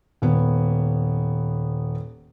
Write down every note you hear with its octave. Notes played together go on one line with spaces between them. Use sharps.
D#1 B3